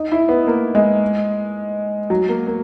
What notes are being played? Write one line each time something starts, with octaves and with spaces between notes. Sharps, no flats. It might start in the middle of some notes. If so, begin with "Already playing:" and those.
Already playing: D#4
E4
B3
A#3
G#3
F#3
A#3
A#3